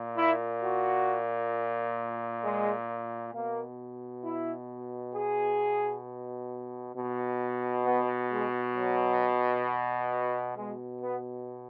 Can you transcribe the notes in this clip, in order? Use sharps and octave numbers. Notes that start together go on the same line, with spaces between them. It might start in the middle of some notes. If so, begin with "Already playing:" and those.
Already playing: A#2
E4
F#4
G#3
B2 A#3
E4
G#4
B2
B3
G#3
F#3
B2 G#3
B3